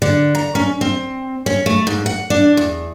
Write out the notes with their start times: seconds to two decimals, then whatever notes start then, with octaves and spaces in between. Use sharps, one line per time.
0.02 D3
0.35 A#5
0.55 C#4
0.81 C4
1.46 C#4
1.66 A3
1.87 G#2
2.06 F#5
2.30 D4
2.57 E2